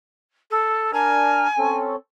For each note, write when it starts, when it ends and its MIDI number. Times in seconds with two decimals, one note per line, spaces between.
0.50 0.91 69
0.93 1.47 62
0.93 1.47 70
0.93 1.77 80
0.93 1.47 89
1.59 1.96 60
1.59 1.96 61
1.59 1.96 69